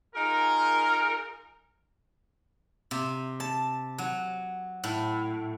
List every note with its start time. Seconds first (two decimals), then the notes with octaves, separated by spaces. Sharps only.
0.15 D#4 F4 G#4 A#4
2.91 C3
3.40 A5
3.98 F#3
4.84 A2